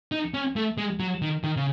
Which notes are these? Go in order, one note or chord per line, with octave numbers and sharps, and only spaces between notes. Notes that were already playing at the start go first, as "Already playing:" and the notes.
D#4
C#4
A3
G#3
F#3
D#3
D#3
C#3